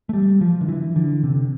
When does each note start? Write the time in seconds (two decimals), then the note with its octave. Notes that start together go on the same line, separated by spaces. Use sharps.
0.09 A3
0.13 G3
0.41 F3
0.61 D3
0.68 E3
0.96 D3
1.23 C3